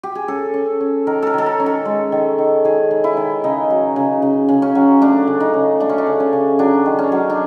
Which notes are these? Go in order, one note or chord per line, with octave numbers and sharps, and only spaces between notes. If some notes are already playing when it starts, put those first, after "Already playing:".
G4
G#4
C#4 A4
C#4
C#4
D#3 A#4
A4 A#4
D#3 A4
A#4
C#4
A4
G#3
D#3
D#3
D#3 G#4
D#3
E4
D#3
C#3 D#4
F#3
C#3
C#3
C#3
C#4
F#3
A3 D4
C#3
D#4
C#3
A3 D4
C#4
D4
C#3
C#4
C#3
F#3 D4
D#3
C#4
F#3
D4